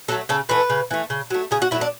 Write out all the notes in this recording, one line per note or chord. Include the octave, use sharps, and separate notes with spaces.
F#3 A3 A4
C#3 A4
E3 A3 B4
C#3
E3 A3
C#3
F#3 A3
C#3 G#4
F#4
F#3 A3 E4
D4